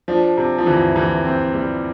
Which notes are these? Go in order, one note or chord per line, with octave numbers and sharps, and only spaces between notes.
F3 D4
C3
F3
D2 E3
C3 E3
C4
G3